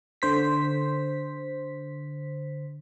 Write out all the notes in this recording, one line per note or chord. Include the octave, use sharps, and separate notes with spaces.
D3 C5 B6